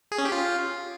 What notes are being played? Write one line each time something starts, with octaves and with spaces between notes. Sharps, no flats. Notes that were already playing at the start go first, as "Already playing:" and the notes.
G#4
C#4
G4
F4